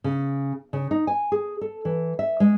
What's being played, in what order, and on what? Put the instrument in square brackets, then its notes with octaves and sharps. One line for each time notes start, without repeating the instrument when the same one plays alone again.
[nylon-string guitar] C#3
C#3
D#4
G#5
G#4
A4
E3
E5
G#3